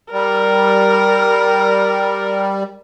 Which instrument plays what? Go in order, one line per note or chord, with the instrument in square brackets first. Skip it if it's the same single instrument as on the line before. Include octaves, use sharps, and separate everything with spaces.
[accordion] G3 [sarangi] A#4